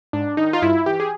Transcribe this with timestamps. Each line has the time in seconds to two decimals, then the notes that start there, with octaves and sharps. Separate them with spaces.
0.13 G#2 D4
0.37 D#3 D#4
0.53 F4
0.62 G2 E4
0.86 E3 G4
1.00 G#4